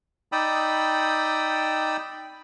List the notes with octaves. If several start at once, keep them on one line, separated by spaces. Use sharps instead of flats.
D#4 D5 G5 B5 D#6 E6